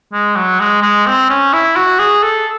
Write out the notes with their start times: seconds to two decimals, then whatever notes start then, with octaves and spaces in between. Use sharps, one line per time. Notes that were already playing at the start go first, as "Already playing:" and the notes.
0.13 G#3
0.36 F#3
0.60 G#3
0.82 G#3
1.07 C4
1.30 C#4
1.53 E4
1.76 F#4
1.99 G#4
2.23 A4